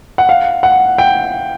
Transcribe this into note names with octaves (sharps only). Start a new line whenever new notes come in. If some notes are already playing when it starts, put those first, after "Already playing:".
F#5
F5
F#5
G5